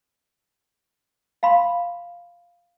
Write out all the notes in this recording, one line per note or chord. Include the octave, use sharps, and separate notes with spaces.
F5 B5 C6